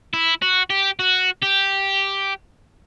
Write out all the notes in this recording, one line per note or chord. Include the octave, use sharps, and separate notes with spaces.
E4
F#4
G4
F#4
G4